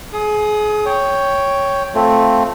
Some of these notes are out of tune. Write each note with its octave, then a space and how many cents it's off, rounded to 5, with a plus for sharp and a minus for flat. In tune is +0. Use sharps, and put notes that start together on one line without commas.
G#4 +30 D#6 +0
C#5 +5 G5 +0
A3 +0 C4 +0 F4 +0